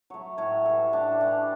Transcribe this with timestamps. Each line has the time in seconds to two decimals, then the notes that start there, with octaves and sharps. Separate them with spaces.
0.10 F#3 A3 C#5
0.38 A2 C#5
0.66 E3 G3 A4
0.93 A2 D4
1.21 E3 G3 D4